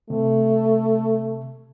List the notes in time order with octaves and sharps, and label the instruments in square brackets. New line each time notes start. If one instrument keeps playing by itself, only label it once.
[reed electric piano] C3 [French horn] A3